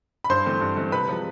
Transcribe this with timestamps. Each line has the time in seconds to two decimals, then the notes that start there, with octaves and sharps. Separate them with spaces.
0.24 B5
0.29 G2 C5 C6
0.46 E3 A3 C4
0.61 G2
0.77 E3 A3 C4
0.92 C3 B4 B5
1.09 F3 G#3